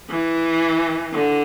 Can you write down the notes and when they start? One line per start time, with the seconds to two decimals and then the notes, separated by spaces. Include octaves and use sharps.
0.10 E3
1.13 D3